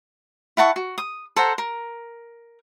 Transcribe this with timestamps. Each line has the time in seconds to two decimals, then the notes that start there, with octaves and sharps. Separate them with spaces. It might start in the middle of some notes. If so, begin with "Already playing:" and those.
0.57 E4 F#5 A5 C#6
0.76 F#4
0.98 D#6
1.36 A4 C5 F#5 A#5
1.58 A#4